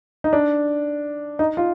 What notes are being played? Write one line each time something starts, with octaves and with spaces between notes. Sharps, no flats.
D#4
D4
D#4
F4